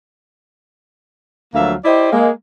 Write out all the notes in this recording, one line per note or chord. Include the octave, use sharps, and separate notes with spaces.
D2 F3 F#3 A#3 E5 F5
E4 G4 C5 D5 D#5
G#3 A#3